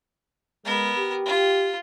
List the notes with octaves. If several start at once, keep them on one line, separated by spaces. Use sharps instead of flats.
G#3 B3 A#4
G4
F4